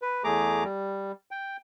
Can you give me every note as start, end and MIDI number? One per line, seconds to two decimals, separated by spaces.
0.02 0.23 71
0.24 0.64 40
0.24 0.64 57
0.24 0.64 68
0.24 0.64 82
0.24 0.64 86
0.64 1.12 55
1.31 1.57 79